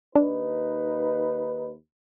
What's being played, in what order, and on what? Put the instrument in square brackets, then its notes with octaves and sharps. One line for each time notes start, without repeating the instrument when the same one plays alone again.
[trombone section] D#2 D#4 B4 [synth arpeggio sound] D4